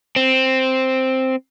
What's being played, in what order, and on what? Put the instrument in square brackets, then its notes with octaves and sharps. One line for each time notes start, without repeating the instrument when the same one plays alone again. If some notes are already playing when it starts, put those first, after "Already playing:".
[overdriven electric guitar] C4